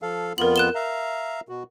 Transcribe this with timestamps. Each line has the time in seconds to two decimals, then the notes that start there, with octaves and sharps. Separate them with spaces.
0.02 F3 A4 F5
0.38 F2 B3 F4 A#4 F#7
0.56 F#6 E7 G7
0.75 E5 F5 A#5
1.49 B2 F#4